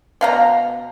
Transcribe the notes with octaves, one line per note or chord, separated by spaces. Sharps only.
B2 F5 A#5